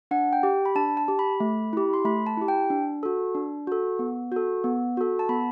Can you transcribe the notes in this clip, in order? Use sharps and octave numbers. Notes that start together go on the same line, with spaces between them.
D4 F#5
G5
G4
B5
D4 A5
A5
G4
B5
A3
E4 G4
C6
A3 B5
A5
E4 G4
G5
D4
F#4 A4
D4
F#4 A4
B3
F#4 A4
B3
F#4 A4
A5
B3 B5